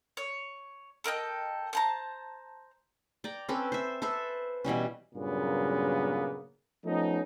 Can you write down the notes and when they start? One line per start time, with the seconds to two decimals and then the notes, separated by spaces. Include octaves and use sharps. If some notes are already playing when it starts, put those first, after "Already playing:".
0.17 C#5
1.04 A4 A#4 D#5 G5
1.73 C5 A5 A#5
3.24 D5 G5 A#5
3.49 C4 C#4 A4 B4
3.72 C5 E5
4.02 A4 B4 C5 E5
4.64 B2 E3 G3 C#4
5.14 G2 A#2 C#3 F#3 A#3 B3
6.85 F3 A3 B3 C#4 D#4